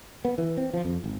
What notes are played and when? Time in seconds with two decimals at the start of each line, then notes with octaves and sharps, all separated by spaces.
0.25 B3
0.38 E3
0.57 C4
0.73 F3
0.85 F2
1.04 G#1